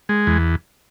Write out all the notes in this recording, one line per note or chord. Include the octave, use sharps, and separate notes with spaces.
G#3
E2